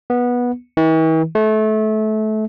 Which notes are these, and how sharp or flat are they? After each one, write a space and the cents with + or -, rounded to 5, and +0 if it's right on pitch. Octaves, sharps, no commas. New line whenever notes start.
B3 -15
E3 -45
A3 -25